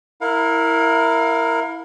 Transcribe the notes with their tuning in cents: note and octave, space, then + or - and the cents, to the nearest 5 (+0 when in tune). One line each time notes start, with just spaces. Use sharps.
E4 +0 A#4 -10 F5 +30